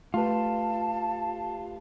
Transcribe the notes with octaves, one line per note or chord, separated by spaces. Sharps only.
A3 F4 G4 B4 A5